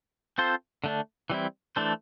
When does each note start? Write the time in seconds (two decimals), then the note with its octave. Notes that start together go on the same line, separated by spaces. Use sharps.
0.38 C4 F4 A4 C5
0.84 D3 A3 D4
1.30 E3 G3 C4 E4
1.76 E3 A3 D4 A4 C5